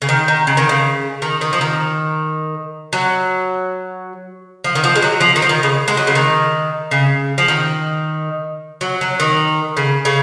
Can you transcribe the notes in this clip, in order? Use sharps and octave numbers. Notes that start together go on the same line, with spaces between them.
C#3
D#3
D#3
C#3
D#3
C#3
D#3
D#3
F3
D#3
F#3
F3
D#3
F3
G#3
F#3
F3
D#3
F3
D#3
C#3
G#3
F#3
C#3
D#3
C#3
F3
D#3
F#3
F#3
D#3
C#3
C#3